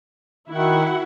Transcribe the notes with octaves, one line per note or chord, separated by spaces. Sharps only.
D#3 E4 F#4 F#5